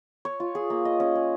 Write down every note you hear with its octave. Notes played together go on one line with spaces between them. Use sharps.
C#5
F4
G#4
A#3
D#5
C#4
G#4